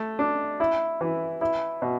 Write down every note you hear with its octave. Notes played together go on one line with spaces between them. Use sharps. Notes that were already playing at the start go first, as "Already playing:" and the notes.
Already playing: A3
D4
E4
E3
E4
B2